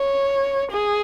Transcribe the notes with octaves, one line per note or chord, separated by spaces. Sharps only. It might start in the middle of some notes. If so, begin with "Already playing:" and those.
Already playing: C#5
G#4